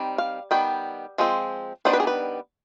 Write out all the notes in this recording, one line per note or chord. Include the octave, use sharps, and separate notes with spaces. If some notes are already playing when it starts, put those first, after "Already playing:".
Already playing: D#3 G3 C4
F5
D#3 G3 B3 G5
F3 G#3 C4
D#3 G3 B3 D4 C5
B4
G#4
B4